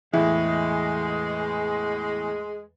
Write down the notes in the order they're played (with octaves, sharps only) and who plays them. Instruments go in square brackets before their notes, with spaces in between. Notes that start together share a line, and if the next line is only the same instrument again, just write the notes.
[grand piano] E2 A2 [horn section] G#3 [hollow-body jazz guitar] E4